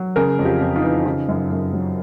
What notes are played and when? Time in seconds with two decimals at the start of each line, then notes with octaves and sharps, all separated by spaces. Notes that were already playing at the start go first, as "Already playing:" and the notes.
Already playing: F#3
0.16 C#3 G#4 A#4
0.39 F2
0.45 F4 G4
0.61 F2
0.76 D#4 F4
0.83 E3
1.06 C#3 D#4 F4
1.29 F#2
1.51 F#2
1.73 F#3